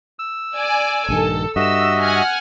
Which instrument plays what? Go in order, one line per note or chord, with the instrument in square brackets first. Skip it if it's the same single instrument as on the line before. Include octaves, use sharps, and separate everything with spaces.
[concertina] E6
[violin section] D5 G#5 D7
[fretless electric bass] A#1 G2 D#3 [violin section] A4
[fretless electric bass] G2 [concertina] F#4 D#5 E5 [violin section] E6
[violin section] F#5 G#5 F6